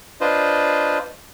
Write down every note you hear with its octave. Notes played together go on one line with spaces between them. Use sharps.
D4 F4 B4 C5 D#5